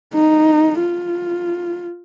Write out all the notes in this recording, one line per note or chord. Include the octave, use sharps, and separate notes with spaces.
D#4
F4